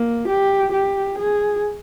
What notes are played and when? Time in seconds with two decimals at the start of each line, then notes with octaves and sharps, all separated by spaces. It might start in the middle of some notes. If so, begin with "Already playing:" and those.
Already playing: A#3
0.29 G4
0.73 G4
1.19 G#4